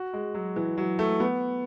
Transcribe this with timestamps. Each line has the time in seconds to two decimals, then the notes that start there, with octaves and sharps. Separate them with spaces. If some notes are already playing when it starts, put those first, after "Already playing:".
Already playing: F#4
0.13 G#3
0.34 F#3
0.56 E3
0.78 F#3
0.99 A3
1.20 B3